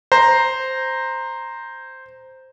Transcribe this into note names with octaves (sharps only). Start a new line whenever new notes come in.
C5 A#5